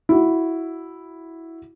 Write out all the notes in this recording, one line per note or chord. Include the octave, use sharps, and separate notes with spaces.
E4 F#4